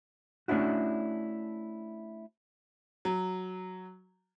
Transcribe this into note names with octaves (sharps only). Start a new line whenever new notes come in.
A3 C#4 D4 E4 F#4
F#3